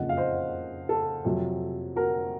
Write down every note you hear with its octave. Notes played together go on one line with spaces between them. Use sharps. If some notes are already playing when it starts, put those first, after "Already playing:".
Already playing: F#1 F2 C#3 D#5 F#5
F5
C5 D#5
A4
F2 C3 F#3
F#4 A#4